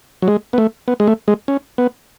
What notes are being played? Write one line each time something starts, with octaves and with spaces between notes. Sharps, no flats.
F#3
G#3
B3
A3
B3
G#3
A3
G#3
C#4
B3